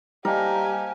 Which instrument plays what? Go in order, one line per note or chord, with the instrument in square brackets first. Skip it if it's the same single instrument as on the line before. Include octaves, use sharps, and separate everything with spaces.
[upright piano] G3 [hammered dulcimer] A#3 A#4 [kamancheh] G4 G#5 [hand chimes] C5 D#5 A5